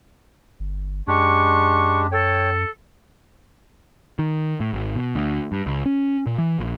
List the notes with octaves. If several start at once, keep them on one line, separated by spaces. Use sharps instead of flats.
G1
F#2 G#3 D4 G4 C#6
A4 C#5 G5
D#3
A2
G#1
B2
D2
G2
C#2
C#4
A#2
E3
A#1